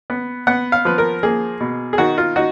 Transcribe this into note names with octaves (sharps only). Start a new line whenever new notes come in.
B3
B3 F#5
F5
F3 B4
A#4
A#3 G#4
B2
G#4
D#3 F#4
F4
D#4 F#4